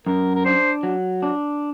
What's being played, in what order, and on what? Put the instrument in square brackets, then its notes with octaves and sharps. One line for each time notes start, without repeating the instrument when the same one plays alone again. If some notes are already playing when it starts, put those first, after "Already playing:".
[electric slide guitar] F#2 [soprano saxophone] A#4
[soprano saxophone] A#4
[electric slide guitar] D4 [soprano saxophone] C5
[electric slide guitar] F#3
D4